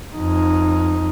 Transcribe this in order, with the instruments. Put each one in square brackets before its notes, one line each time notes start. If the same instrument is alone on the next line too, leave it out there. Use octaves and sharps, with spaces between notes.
[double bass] F2 D#4